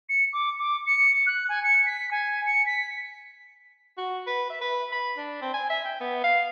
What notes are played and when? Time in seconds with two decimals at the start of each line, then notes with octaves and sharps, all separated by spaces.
0.09 C#7
0.32 D6
0.59 D6
0.86 C#7
1.26 F#6
1.48 G#5
1.63 C#7
1.86 B6
2.11 G#5
2.46 C#7
2.66 B6
3.98 F#4
4.27 B4
4.50 E5
4.61 B4
4.92 B5
5.17 D4
5.41 C4
5.54 G#5
5.70 E5
5.85 G5
6.01 B3
6.24 F5